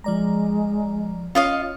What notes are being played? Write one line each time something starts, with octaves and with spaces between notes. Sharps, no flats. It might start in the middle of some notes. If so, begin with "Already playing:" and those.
F3 G#3 D5 A#5
C#4 F4 C#5 D#5 F5